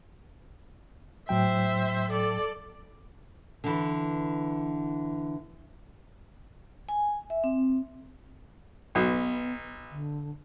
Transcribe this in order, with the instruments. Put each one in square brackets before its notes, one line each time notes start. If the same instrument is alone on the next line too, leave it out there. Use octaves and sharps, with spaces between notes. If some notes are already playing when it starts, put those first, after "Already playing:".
[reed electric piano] A2 F#3 G5 [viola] C5 E5
[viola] A4 D5
[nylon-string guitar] D3 E3
[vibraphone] G#5
E5
C4
[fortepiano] B1 [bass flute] B3
[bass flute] D3